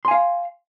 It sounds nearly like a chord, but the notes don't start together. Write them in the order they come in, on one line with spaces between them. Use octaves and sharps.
C6 G#5 F5